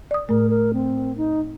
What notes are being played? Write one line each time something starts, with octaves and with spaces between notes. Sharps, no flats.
D5 D#6
A2 A3 A#4
A#4
C4
D#4